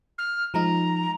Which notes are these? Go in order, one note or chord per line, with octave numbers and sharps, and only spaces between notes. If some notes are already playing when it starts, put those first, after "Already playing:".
F6
F3 G#3 D#4 A#5